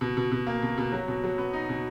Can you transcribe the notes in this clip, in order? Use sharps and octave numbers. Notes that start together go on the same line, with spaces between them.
B2
B2
B2
A#3
B2
B2
F#3
B2
F#3
B3
D#4
B2